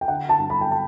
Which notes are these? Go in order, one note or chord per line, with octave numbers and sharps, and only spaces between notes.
G5
D3 F#5
A5
G2
B5
G5
A5